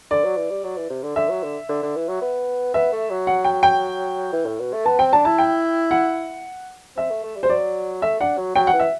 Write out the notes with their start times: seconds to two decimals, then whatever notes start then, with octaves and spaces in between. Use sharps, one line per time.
0.11 D3 D5
0.24 F#3
0.37 E3
0.50 G3
0.63 F#3
0.77 E3
0.90 C3
1.03 D3
1.16 D3 E5
1.30 F#3
1.43 D3
1.69 D3
1.82 D3
1.96 E3
2.08 F#3
2.22 B3
2.74 B3 E5
2.92 A3
3.10 F#3
3.27 F#5
3.44 G5
3.63 G5
4.32 E3
4.46 A2
4.60 B2
4.73 A3
4.86 B3 A5
4.99 C4 G5
5.13 D4 A5
5.25 E4 A5
5.38 G5
5.91 F#5
6.96 C4 E5
7.11 A3
7.24 A3
7.36 G3
7.43 C5
7.49 F#3 D5
8.02 A3 E5
8.20 D4 F#5
8.37 F#3
8.55 F#3 G5
8.67 F#5
8.73 E3
8.80 E5